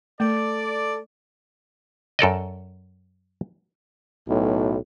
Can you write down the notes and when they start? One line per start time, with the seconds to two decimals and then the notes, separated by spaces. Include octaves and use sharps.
0.20 A3 A4 D5
2.19 F#2 A4 D5 D#5
4.28 B1 A2